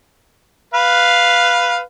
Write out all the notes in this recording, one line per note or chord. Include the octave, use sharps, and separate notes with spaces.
B4 F5